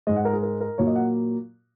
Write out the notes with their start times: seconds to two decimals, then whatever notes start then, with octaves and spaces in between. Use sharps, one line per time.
0.07 G#2 G#3 D#5
0.16 F#5
0.25 A#4
0.33 G#4
0.43 A#4
0.60 A#4
0.78 A#2 F#3 A#3 C#5
0.87 D#5
0.96 F#5